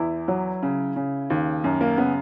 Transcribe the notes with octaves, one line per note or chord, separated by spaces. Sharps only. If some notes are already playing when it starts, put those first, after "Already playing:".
Already playing: E2 E4
F#3
C#3
C#3
D#2
F#2
A#3
C#3 B3